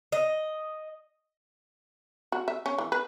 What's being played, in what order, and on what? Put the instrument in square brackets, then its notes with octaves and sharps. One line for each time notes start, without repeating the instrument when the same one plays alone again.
[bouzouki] D#5
[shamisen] F#4
E5
C#4
E3
B4